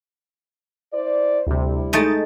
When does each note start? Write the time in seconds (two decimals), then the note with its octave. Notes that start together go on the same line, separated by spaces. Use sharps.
0.92 E4 C5 D5
1.47 D2 C3 G3 E4
1.93 G#3 A3 D#4 G6 A6